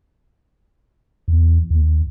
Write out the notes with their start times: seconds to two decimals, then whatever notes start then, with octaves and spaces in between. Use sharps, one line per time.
1.28 E2
1.70 D#2